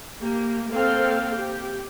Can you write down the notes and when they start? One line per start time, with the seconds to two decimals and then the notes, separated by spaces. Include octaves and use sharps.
0.19 A#3 G4
0.71 A#3 C4 A4 F5 G5
1.34 G4